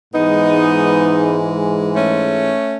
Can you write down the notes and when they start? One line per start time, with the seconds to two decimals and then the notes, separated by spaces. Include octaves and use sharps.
0.14 G#2 E3 G#3 B3 D#4
1.94 A3 C#4